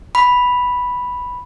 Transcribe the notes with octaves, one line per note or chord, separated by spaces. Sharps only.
B5